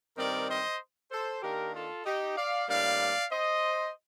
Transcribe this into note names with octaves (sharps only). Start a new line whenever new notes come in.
G2 D#3 G3 C4 A#4 D5
C5 D#5
A4 C5
D#3 A#3 D4 G4 A#4
F4 A4
D#4 G4
D5 F5
A2 G3 A#3 D4 D5 F5
C5 D#5